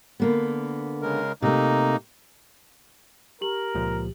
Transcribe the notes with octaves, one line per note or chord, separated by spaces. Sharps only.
D3 A#3 B3
C#3 G#3 A#4
C3 A3 A#3 D#4
G4 A#4 F#7
C#2 A#2 F3